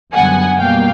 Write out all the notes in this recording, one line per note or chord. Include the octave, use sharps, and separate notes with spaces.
F#2 D3 G3 B3 F#5 G#5
B2 G3 A#3 F5 G5